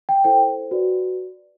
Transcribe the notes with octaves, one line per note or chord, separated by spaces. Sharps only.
G5
E4 A4 C5 G5
F#4 B4 D5